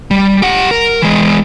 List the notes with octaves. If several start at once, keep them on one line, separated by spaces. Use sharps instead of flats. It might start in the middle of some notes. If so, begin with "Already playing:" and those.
G3
G4 F#5
A#4
E3 G#3